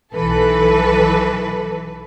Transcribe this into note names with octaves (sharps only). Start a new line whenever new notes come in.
B1 E3 A4 B4